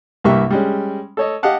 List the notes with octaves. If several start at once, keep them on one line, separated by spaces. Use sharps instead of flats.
C2 G2 A#3 G4 E5 C#6
G3 G#3 C#4
A4 C#5 D#5
G4 D#5 F5 F#5 A5